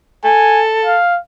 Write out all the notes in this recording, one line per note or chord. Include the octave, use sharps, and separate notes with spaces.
A4 G#5
F5